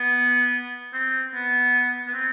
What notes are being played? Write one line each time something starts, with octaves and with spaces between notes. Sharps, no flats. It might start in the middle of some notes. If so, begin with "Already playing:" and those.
Already playing: B3
C4
B3
B3
C4